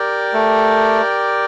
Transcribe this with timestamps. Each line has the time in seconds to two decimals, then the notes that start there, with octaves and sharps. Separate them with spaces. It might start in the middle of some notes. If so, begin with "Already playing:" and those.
Already playing: G4 A#4 D5 G5
0.33 A3